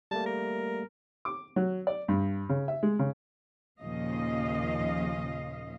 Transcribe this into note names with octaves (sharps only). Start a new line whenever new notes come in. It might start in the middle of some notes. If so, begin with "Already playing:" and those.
G3 A3 A#3 A5
A#4
D6
F#3
D5
G2
C#3
E5
G#3
C#3
D#2 A#2 C#3 F3 D#5 F5